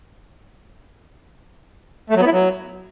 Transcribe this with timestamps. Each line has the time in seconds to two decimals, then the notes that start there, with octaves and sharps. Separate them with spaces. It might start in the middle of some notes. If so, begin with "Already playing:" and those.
2.10 A3
2.15 F#3
2.21 B3
2.27 E4
2.32 F#3